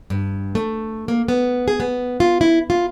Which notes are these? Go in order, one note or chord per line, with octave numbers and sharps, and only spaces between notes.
G2
A3
A#3
B3
G#4
B3
F4
E4
F4